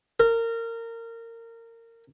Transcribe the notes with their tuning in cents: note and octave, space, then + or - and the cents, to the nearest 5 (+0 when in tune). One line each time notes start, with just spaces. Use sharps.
A#4 -25